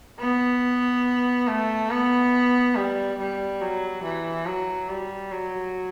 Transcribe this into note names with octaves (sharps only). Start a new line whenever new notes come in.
B3
A3
B3
G3
G3
F#3
E3
F#3
G3
F#3